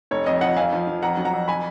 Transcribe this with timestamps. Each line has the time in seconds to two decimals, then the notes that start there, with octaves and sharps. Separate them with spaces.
0.11 F1 C#5
0.26 F2 D#5
0.41 F3 D#5 F#5
0.57 F2 F5 G#5
0.73 F3
0.87 F3
1.03 F2 F#5 A#5
1.17 F#3
1.25 F#5 A#5
1.33 F2
1.48 G#5 B5